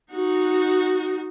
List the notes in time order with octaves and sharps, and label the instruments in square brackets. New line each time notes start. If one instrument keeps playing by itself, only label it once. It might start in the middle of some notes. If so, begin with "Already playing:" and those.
[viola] D#4 F#4